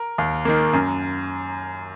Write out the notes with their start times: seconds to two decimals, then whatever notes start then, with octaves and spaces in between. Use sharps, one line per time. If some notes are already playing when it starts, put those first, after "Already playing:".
Already playing: A#4
0.18 D#2
0.45 D#3 A#3
0.73 F#2